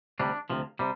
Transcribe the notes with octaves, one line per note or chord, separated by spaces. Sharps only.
D2 C3 G3 D4
D2 C3 F3
C3 G3